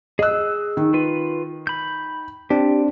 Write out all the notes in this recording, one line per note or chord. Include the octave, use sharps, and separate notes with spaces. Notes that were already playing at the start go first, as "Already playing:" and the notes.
G#4 D#5 E6 F#6
D#3
F4 B4
B5 G6
C4 D4 G4